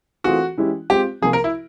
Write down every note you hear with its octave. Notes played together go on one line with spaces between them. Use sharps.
E3 A3 C4 F4 F#4 G#4
E3 G#3 C#4 E4 G4
G#3 C4 F4 G4
C3 F3 A#3 G#4
A#4
E4